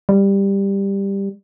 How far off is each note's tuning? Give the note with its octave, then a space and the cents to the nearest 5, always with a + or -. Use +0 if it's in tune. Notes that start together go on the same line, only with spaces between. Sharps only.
G3 +10